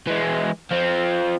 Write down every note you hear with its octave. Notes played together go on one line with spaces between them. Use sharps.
E3 G#3
F3 C4